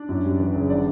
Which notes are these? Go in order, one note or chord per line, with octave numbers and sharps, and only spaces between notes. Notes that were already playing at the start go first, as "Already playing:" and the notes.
Already playing: D4 D5
F#2
G3
E3
F#1
D3 D4 D5